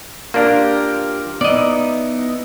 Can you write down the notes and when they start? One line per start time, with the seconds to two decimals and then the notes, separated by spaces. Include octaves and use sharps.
0.34 A#3 D4 F4 G4 A#4
1.41 B3 D#4 E4 D5 D#5